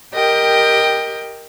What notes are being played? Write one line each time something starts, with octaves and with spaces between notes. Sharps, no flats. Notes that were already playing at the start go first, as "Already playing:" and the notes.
G4 A#4 D#5 G5